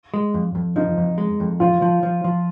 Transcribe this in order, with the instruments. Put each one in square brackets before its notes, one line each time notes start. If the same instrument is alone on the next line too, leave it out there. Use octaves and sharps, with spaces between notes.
[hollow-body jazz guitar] G#3
F2
F2
[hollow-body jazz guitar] F3 [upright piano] D#4
[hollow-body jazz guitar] F2
G#3
F2
[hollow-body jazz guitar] F3 [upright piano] F4
[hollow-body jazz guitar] F3
F3
F3